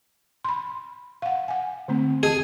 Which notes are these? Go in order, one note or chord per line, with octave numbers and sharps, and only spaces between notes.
B5 C6
F5 F#5
F#5 G#5
D3 A3 C4
G#4 D#5 A5